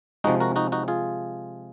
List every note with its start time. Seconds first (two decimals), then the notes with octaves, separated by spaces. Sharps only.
0.24 C3 F3 G#3 D#4 F#4
0.40 F#4 A#4
0.56 D#4 F#4
0.72 D#4 F#4
0.88 F4 G#4